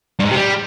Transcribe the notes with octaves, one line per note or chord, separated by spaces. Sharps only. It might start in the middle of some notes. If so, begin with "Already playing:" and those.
G2
G#2
C3
G3